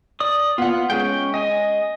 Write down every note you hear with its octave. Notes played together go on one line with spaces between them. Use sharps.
D5 D#6
B3 F4 F#5
G#3 C#4 G#4 G5
D#5 G#5